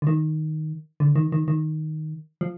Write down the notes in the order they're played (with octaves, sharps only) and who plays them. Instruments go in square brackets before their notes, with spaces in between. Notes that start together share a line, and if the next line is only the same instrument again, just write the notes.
[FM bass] D3
D#3
D3
D#3
D#3
D#3
F3